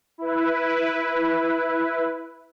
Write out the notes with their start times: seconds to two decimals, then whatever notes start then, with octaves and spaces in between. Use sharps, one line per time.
0.18 E4 B4